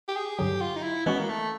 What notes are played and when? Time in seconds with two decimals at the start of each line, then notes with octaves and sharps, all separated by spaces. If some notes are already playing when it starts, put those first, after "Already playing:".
0.08 G4
0.16 G#4
0.38 G2 D3 F#3 G4
0.61 F4
0.76 D#4
0.83 E4
1.06 E3 G#3 B3 C#4 F#4
1.19 A#3
1.29 A3